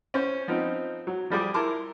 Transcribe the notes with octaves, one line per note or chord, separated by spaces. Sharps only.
C#4 C5
F3 B3 C4 D#4
F#3
F3 G3 G#4 D6
E4 A#4 A5 C6 D6